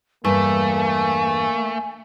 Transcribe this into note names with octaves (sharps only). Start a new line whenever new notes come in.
E2 G2 A3 A#3 G#5